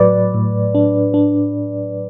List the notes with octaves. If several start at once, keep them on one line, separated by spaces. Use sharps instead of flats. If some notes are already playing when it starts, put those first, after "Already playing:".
Already playing: A2 F#3 B4 D5
A2
D4
D4